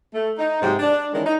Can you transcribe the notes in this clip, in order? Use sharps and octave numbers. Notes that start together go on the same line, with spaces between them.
A3
D#4
G#2 C3 F#3 G#3 G4
D4
D#3 E3 G#3 C#4 D4
D#4